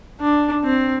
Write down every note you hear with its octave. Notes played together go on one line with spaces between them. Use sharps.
D4
C4